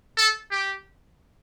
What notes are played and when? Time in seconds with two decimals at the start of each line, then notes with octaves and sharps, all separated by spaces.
0.17 A4
0.51 G4